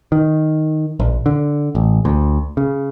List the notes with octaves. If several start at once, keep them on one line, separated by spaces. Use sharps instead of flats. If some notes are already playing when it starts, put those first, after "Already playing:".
D#3
A#1
D3
A1
D2
C#3